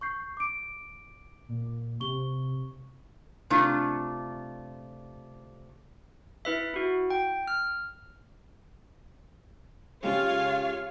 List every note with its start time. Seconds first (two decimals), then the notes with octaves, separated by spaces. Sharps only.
0.01 C#6 G6 C7
0.37 D6 D7
1.49 A#2
2.00 C3 C#6 G7
3.50 C3 A3 D4 F4
6.45 E4 B4 E5
6.74 E4 F#4
7.10 G5
7.48 F6
10.03 C#3 G#3 F4 G4 C#5 F5